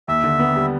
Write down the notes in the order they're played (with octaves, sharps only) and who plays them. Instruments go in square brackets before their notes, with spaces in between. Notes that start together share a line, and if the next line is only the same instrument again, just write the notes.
[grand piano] D#2 [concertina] E5
[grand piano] D3
B3
G3